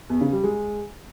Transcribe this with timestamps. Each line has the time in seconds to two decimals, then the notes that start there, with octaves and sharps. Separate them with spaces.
0.10 E2
0.21 C#3
0.32 G3
0.44 G#3